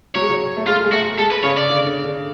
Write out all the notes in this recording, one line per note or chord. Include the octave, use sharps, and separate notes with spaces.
F#3 C#5
G#3
F#3
A3
G#3 F4
G#3
A3 F#4
G#3 A4
B4
C#3 C#5
D5
D3
D3
D3